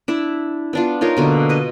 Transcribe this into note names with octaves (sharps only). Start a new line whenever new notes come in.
D4 E4 E5
B3 D4 F4
D#4 F4 A#4 C#5
B2 D3 A#3
B4 D#5